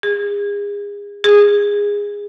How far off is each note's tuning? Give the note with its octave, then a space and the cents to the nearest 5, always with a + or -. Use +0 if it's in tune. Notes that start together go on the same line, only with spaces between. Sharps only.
G#4 -35
G#4 -20